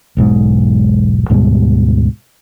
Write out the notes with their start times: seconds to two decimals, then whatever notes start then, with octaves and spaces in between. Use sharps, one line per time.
0.17 E1 B1 G#2
1.30 D2 G#2 B2 G3